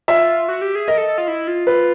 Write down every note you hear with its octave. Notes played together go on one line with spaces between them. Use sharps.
F4 E5
F#4
G4
G#4
A#4 D#5
A4
A4
F4
E4
F4
F4 B4